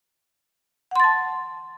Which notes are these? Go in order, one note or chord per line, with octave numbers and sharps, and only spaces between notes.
F#5 A5 C6 A6